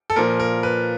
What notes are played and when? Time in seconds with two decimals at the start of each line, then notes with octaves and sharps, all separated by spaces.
0.10 A4
0.16 A#2 F3 A#4
0.40 A#4
0.63 B4